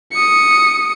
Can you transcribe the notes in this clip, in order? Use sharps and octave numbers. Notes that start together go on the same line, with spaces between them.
D#6 C#7